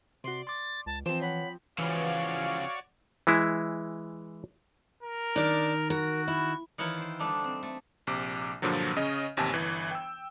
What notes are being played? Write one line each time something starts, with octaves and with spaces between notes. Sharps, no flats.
C3 F#4 D5 C6
C6 D6 A6
C#2 A5
E3 F3 C4 F4 C5 E7
C#5 F#5 B5
C#3 E3 F3 F#4 C#5 D5 F5
E3 G#3 E4
A#4
D#3 D4 D5
F#4 A#4
E4
D#3 E3 E4 F4 A#4 C#5
C5 G5
D3 G3 A3 D4 D#4
C4
A3
A#1 C3 D6
G2 A#2 D3 F3 F#3
C#3 C#4 D#5
A1 D#2 C3 G#5 A5
G1 E3
G5 E6